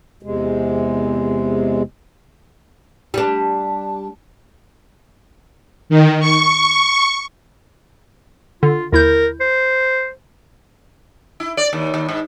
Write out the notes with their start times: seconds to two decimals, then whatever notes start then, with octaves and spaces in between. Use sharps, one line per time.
0.23 E2 C3 G#3
3.14 G3 D4
5.90 D#3
6.20 C#6
8.63 D3 F4
8.93 D#2 E4 A#4 G6
9.40 C5
11.40 E4
11.57 D5
11.73 D#2
11.94 D#2
12.09 G#2